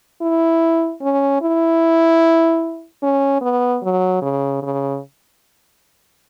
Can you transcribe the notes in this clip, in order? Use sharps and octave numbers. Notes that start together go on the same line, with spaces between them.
E4
C#4
E4
C#4
B3
F#3
C#3
C#3